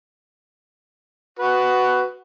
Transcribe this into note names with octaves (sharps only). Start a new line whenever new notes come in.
F#4 B4